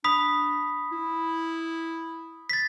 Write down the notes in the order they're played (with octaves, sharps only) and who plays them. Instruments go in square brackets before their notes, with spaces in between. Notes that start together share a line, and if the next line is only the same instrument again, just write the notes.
[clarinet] D4 [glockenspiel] B5 D#6 B6
[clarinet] E4
[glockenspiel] A6 B6